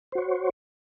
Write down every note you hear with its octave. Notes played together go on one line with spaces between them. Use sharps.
F#4 C5 C#5